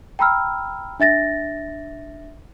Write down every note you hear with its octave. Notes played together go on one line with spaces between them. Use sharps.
G5 A#5 B5 E6 F6
D4 E5 A6 A#6